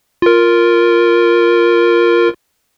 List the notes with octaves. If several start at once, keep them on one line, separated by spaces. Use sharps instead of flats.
F4 A#4